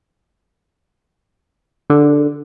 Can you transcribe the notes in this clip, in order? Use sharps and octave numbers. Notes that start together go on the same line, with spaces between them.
D3